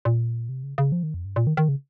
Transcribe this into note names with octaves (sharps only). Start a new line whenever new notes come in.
A#2
C3
C#3
C#3
F3
D#3
F2
G2
A#2
D#3
D#3
C#3